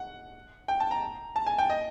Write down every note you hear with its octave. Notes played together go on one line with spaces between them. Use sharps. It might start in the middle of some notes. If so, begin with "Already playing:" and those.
Already playing: F#5
G5
A5
A#5
A5
G#5
G5
D#5